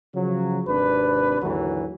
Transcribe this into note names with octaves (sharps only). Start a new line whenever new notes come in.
C#3 F3 F#3
G#1 C3 D4 B4
D#2 G#2 D3 E3 F#3